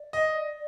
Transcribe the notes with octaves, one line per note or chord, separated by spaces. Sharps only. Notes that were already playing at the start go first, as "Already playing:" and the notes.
Already playing: D5
D#5